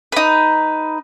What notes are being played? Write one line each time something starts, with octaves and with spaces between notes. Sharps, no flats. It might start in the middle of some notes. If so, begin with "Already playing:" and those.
D#4 B4